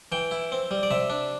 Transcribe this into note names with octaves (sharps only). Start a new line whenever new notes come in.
E3 G5
E4
C4
G3
D5
C3 E5
D4